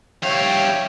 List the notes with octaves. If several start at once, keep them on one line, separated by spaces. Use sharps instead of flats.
G3 C#5 E5 F5 G5